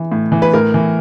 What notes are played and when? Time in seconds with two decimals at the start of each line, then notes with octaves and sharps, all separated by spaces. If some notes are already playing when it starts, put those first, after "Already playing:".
Already playing: E3
0.12 A2
0.32 E3
0.42 B4
0.53 A2 A#4
0.74 E3